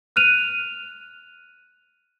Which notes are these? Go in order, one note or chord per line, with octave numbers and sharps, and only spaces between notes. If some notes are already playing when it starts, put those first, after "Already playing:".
F6 F#6 D#7 F7